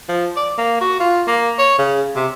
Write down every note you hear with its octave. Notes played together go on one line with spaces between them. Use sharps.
F3
D5
A#3
F#4
F4
A#3
C#5
C#3
C3